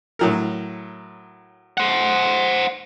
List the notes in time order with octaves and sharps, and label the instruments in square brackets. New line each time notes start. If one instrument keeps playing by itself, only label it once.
[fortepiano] A2 F#3 A#4
[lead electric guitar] C5 F#5